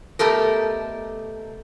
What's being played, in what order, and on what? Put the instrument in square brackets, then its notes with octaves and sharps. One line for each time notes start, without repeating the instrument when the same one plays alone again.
[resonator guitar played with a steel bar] B2 A3 G4 A4 A#4